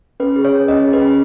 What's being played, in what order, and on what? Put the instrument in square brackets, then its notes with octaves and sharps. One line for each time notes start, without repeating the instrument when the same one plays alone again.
[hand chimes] C#4 B4
G#4
C#5
C#4
C#4 D#5
G#4
B4
C#4